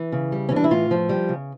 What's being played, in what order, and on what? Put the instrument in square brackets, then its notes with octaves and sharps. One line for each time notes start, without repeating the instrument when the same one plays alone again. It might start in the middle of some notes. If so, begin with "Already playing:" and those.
Already playing: [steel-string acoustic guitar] E3
C#3
G3
E3 C#4
D4
E4
A2 F4
F3
G3
C#3